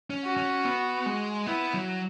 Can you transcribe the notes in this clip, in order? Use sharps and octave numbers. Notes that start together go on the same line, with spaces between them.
C#4
F#4
C#4
B3
G#3
B3 E4
F#3